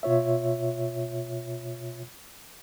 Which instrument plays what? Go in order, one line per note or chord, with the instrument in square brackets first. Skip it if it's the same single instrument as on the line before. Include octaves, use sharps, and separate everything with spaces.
[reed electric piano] B2 F4 C#5 E5